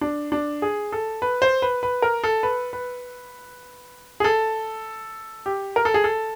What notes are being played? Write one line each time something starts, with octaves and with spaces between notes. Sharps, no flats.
D4
D4
G#4
A4
B4
C5
B4
B4
A#4
A4
B4
B4
G#4
A4
G4
A#4
A4
G#4
A4